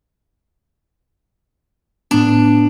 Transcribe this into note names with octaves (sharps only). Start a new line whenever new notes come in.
A2 B3 D4